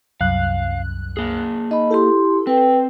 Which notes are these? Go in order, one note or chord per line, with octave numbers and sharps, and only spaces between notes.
C2 F#2 F5 F#6
A#3 G#4
D#4 D#5 B5
E4 G4 A4 C6
C4 B4 G5